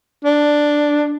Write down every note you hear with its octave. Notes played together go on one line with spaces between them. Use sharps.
D4